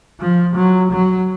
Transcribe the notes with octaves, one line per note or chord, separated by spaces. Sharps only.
F3
F#3
F#3